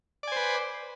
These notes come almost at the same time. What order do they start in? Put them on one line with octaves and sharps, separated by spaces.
D5 G#5 C5 B4